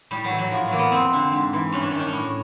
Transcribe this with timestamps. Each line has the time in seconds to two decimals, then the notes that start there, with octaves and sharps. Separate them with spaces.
0.11 A2 G3
0.24 F#3
0.31 E3
0.38 F#3
0.51 A2 F3
0.66 F#3
0.72 E3 A#3
0.79 B3
0.92 F2 C4
1.13 D3
1.32 G#2
1.53 E3
1.72 G2 C#4
1.81 D4
1.91 D#3 C#4
1.99 D4
2.08 A2 C#4